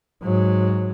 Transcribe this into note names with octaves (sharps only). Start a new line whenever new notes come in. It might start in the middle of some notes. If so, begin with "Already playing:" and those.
G#2 F#3